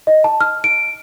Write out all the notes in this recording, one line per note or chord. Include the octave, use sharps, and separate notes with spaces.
D#5
A5
F6
D7